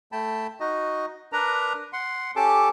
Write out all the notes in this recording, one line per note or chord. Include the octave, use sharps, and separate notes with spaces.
A3 G5 A5 B5
D#4 F#4 D#5
D4 A#4 B4 A#5
F#5 C6
C#4 G4 A4 A5 D6